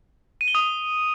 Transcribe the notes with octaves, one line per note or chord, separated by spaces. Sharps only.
D#7
G7
D#6